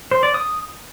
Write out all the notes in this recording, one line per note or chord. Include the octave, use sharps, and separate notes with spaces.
C5
D5
D#6